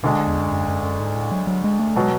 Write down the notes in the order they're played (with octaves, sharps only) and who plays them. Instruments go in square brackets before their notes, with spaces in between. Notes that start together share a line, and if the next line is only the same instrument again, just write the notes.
[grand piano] D2 D3 G#3 D4 [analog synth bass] B2
[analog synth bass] E2
F#2
F#2
F#2
F#2
G#2
A2
F#3
F#3
G#3
A3
[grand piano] B2 F#3 [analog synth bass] G#3